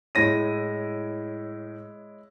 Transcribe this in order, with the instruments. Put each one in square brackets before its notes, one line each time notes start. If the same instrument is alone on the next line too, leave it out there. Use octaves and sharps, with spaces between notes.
[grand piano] A2 A#6 D#7 [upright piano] G#3 E4 C#5